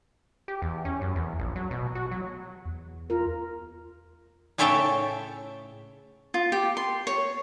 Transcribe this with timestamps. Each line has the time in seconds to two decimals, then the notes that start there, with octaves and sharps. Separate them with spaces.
0.48 G4
0.62 E2
0.85 C#4
1.01 F#2
1.15 E2
1.39 A#1
1.56 F#3
1.71 B2
1.95 F#4
2.11 F#3
2.65 E2
3.10 F4 A#4
4.58 A2 C#3 C#5 E5 G5 A5
6.34 F4
6.52 G4
6.77 C6
7.07 C#5